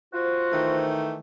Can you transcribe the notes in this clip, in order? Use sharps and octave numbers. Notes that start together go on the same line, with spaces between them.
F4 F#4 C5
D#3 E3 A3